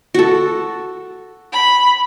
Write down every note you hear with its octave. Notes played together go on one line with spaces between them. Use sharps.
F#4 A4
B5